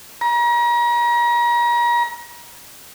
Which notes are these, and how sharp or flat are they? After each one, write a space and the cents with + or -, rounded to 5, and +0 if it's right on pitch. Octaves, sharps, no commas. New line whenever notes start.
A#5 +35